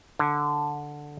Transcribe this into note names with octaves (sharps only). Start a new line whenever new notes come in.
D3